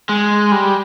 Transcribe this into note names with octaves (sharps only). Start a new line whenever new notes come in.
G#3
G3